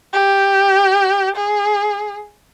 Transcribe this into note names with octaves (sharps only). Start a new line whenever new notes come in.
G4
G#4